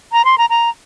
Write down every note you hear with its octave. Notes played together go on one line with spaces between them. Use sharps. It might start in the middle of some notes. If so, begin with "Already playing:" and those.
A#5
C6
A#5
A#5